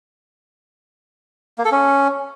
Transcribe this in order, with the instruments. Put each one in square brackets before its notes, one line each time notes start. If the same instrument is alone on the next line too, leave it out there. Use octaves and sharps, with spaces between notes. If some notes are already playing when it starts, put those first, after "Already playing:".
[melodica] A#3
A4
C#4